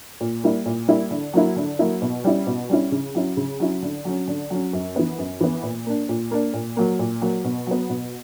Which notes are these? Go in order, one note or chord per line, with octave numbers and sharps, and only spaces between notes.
A#2
G3 A#3 E4
A#2
G3 A#3 E4
D3
F#3 A#3 E4
D3
F#3 A#3 E4
B2
G3 C#4 E4
B2
G3 C#4 E4
C#3
F#3 C#4 E4
C#3
F#3 C#4 E4
D3
F#3 C#4
D3
F#3 C#4
F#2
E3 B3
F#2
E3 B3
A#2
A#3 D4
A#2
A#3 D4
A#2
F#3 A#3
A#2
F#3 A#3
B2
F#3 B3
B2